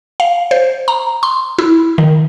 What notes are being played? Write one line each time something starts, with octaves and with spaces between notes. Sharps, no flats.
F5
C5
A#5
C6
E4
D#3